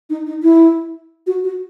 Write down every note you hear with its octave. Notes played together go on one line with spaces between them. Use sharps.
D#4
D#4
E4
F#4
F#4